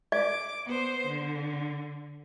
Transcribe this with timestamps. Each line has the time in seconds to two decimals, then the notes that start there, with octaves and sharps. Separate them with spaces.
0.12 D5 D6
0.65 B3 C5
1.07 D3